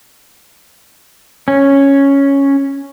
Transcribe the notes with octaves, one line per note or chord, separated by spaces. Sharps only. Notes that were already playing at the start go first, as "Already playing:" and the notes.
C#4